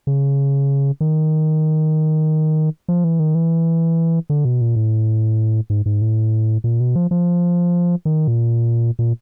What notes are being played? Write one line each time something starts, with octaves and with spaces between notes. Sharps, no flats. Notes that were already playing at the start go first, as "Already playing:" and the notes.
C#3
D#3
F3
E3
D#3
E3
D3
B2
A#2
A2
G#2
G#2
A2
A#2
B2
F3
F3
D#3
A#2
A#2